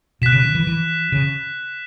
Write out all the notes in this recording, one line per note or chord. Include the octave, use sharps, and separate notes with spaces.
B2 F#6 B6 E7
C#3
D#3
E3
E3
C#3